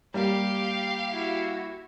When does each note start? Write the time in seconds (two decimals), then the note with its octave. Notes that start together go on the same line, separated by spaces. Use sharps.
0.14 G3 A#3 G4 F5
1.11 E4 F#4